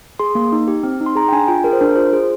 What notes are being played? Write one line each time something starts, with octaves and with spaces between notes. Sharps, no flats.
G#4 C6
A#3
D#4
G4
C4
D#4
C6
G#4 A#5
G5
D4 G#5
F4 G5
G#4 A#4
C5
D4 A#4
F4 C5
G#4